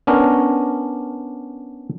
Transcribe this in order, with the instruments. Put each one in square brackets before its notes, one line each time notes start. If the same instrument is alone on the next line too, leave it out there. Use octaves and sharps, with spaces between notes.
[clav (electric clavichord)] B3 C#4 D4 A#4